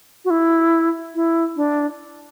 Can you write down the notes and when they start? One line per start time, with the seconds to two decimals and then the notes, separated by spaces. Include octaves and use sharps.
0.25 F#4
0.30 E4
1.15 E4
1.56 D4